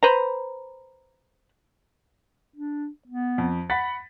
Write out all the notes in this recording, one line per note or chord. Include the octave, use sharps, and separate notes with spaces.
B4 C5 A#5
D4
B3
F2
F#5 B5 A6 B6